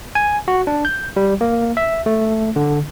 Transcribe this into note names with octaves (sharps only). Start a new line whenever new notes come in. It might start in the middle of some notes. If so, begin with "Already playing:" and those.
G#5
F#4
D4
G6
G3
A#3
E5
A3
D3